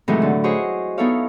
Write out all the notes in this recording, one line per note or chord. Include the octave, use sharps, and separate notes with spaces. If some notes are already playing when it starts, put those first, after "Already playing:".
A2 C3 D#3 E3 F#3 G#3
D3
E4 F#4 G#4 C5 C#5 D#5
B3 D#4 E4 A4 C#5 F5